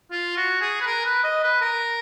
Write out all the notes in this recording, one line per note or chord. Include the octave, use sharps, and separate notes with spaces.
F4
F#4
G#4
B4
A#4
B4
D#5
B4
A#4